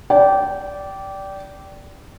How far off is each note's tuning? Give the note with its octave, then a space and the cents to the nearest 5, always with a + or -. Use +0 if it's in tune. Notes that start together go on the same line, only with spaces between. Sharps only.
D5 -15 G5 -15